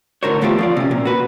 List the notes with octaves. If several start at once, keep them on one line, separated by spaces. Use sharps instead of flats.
A2 D3 A#4 C5 C#5
E2 A3 B3 F4 G4
F3 F4 D5
C3 C#4
A#2
F#4 B4